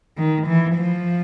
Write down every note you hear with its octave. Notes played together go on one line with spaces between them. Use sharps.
D#3
E3
F3